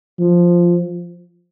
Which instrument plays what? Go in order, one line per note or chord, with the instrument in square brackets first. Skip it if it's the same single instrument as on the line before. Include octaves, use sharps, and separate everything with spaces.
[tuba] F3